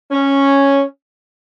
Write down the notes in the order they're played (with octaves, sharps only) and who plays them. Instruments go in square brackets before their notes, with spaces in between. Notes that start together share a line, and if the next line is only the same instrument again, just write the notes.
[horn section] C#4